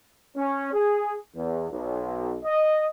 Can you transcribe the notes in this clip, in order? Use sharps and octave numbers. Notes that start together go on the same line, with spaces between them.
C#4
G#4
E2
B1
D#5